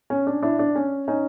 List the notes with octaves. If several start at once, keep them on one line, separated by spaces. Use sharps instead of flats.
C#4
D4
D4 E4
D4
C#4
C#4 D#4